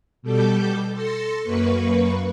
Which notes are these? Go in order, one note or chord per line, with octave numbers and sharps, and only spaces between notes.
B2 G3 A4 D6 G6
A4 C6 A#6 C#7
F#2 A#3 B4 C#6